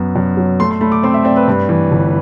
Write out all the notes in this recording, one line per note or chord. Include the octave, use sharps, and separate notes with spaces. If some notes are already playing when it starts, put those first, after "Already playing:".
Already playing: F#2 B3
F#2
F#3
A3 C6
C6
A3 B5
D6
C4 C6
E5
C4 D5
B4
G2
E3
G1